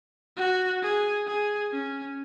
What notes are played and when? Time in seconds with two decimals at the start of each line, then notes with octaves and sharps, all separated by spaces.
0.37 F#4
0.82 G#4
1.26 G#4
1.72 C#4